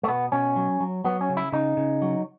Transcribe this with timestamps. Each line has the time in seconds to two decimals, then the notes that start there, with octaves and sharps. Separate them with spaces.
0.03 A3
0.08 B2 B3
0.32 B2 C#4
0.56 F#3
0.80 F#3
1.05 F#3 B3
1.21 C#4
1.29 C#3
1.37 E4
1.52 C#3 D#4
1.77 C#3
2.02 F#3